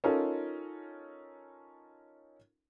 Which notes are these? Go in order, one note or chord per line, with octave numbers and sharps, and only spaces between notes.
C#4 D#4 F4 A4 A#4